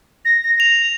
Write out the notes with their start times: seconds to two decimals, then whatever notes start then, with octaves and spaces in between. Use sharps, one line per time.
0.25 A#6
0.44 A#6
0.60 F7